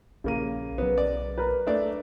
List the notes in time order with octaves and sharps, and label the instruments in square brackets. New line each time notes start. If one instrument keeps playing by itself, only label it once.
[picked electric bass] A#1 [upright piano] C#3 A#3 D#7
[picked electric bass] B1 F#3 [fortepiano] B3
[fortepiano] D5
[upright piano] A#4 B4
[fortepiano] A3 D4 D5